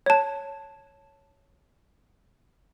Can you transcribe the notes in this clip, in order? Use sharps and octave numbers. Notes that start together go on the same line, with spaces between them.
C#5 A5